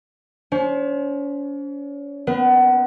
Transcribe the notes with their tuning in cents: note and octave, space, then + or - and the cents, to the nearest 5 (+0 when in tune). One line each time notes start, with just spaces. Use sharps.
C#4 +40 C5 +20
B3 +25 B4 -40